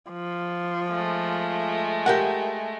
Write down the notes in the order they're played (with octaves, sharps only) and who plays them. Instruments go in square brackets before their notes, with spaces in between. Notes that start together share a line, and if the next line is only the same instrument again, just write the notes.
[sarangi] F3
[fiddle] G#3 A3
[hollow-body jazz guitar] G4 A#4 F#5